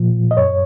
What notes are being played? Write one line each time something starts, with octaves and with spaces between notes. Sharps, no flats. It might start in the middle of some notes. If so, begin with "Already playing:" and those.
Already playing: A#2 F3
D#5
F#2 C#5